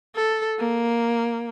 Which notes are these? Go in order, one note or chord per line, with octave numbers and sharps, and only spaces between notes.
A4
A#3